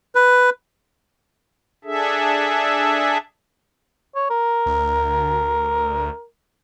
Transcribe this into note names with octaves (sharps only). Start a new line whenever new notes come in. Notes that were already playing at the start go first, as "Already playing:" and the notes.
B4
D4 G#4 A4 E5
C#5
A#4
D2